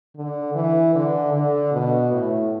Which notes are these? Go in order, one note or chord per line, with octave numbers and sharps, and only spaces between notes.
D3
E3
D3
D3
B2
A2